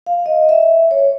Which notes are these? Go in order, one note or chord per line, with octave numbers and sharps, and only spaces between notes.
F5
D#5
E5
C#5